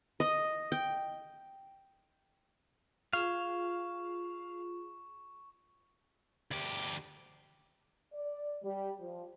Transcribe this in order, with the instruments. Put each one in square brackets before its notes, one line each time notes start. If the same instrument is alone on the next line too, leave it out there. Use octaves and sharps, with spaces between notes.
[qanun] D#5
G5
[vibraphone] F4 G#4 [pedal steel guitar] F5 [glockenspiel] C#6 E7
[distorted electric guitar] D2 G4
[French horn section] D5
G3
F3